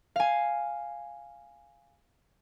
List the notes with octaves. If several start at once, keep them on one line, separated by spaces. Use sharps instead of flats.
F5 G#5